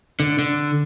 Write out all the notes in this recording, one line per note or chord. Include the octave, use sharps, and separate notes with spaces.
D3
D3